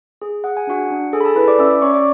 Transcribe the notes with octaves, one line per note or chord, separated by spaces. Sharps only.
G#4
G#4 F#5
G#5
D4 F#4 F#5
D4
G#4 A4 G#5
B5
A4 A5
E4 B4 B5
D5 D6
C#4 E5 E6
D5 D6
C#4 C#5 C#6
D5 D6